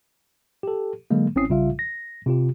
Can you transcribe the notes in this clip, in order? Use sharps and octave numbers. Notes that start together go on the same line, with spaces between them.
G4 A4
D3 F#3 G#3 A#3
G1 C4 C#4 E4 D#6 C7
B1 C#3 G3 F4 E5 F5
A#6
C3 F4 G4